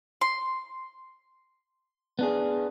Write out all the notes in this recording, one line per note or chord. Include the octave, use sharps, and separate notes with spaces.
C6
B3 D4 G#4